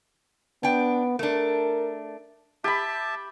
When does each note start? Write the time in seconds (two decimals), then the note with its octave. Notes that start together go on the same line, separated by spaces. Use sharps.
0.63 B3 D4 G5
1.19 A3 D4 A#4
2.64 G4 E5 A5 B5